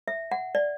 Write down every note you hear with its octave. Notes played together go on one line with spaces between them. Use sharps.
E5
F#5
D5